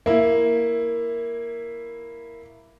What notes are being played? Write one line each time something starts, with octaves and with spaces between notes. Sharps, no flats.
A#3 E4